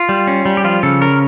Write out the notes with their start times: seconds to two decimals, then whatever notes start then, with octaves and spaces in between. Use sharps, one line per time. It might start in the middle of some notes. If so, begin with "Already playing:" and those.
Already playing: F4
0.09 G3
0.27 C#4
0.45 G3
0.57 G4
0.64 F3 F4
0.83 C#3 A4
1.01 C#4 A#4